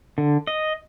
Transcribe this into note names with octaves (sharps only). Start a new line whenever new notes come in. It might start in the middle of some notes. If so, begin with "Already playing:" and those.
D3
D#5